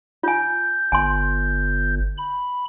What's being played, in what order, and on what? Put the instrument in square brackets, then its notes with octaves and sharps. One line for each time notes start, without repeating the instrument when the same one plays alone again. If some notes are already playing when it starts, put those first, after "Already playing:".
[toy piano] F4 G#5 [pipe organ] G6
[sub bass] G1 [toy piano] G#5 C6
[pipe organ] B5